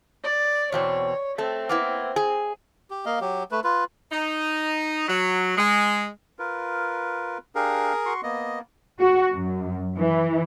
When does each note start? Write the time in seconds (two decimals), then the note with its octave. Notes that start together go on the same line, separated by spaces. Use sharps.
0.24 D5
0.72 E2 B2 C4 C#5
1.38 A3 C4 A4
1.69 A#3 B3 E4
2.16 G#4
2.91 G4
3.06 A#3 D#5 F5
3.21 F#3 G4
3.51 A3 B4
3.64 F4 B4
4.12 D#4
5.08 F#3
5.57 G#3
6.39 F4 A#4 B4
7.55 D4 G4 G#4 A#4 F5
8.06 F#4 C6 C#6
8.23 A#3 B3 D#5
9.00 F#4
9.33 F#2
9.98 E3